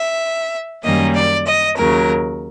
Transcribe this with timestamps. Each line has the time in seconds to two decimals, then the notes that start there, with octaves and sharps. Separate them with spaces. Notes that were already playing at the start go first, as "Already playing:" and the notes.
Already playing: E5
0.84 F#2 D#3 G3 A#3 C#4 D#5
1.15 D5
1.47 D#5
1.76 D#2 C#3 F#3 A#4